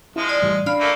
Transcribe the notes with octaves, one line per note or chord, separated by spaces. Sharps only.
F3 G#3 E4
D5
A2 E3 G3
D4 D5 F5 B5 F6 C7
A3 A#3